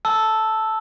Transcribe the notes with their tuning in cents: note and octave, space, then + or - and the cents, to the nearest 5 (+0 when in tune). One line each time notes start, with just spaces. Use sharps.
A5 +0 E6 +0